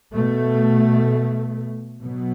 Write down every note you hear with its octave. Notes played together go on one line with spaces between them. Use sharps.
B2 A3
B2 F#3 B3